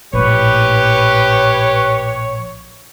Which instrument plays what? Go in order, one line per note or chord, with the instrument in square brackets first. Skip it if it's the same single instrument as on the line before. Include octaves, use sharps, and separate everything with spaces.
[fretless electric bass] A#1 A2 [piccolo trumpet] G4 [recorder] B4 [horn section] C#5